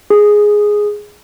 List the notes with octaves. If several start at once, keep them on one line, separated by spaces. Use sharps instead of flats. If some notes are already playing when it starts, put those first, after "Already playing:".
G#4